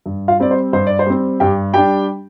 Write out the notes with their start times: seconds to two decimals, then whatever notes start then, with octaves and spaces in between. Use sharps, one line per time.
0.06 G2
0.28 F4 F5
0.40 G3 C4 D5
0.51 C5
0.73 G2 C5
0.87 D5
0.99 C5
1.06 G3 C4
1.40 G2 G4 G5
1.73 G3 D4 G4 G5